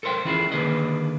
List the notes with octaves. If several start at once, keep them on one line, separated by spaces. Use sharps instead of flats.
A4 A#4 C5 D#5 G5
E3 C#4 E4 F4 G#4
D3 D#3 A#3 G#4 B4 D#5